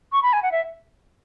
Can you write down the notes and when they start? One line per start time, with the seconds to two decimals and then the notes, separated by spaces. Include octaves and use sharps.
0.12 C#6
0.23 B5
0.33 G#5
0.43 F#5
0.52 E5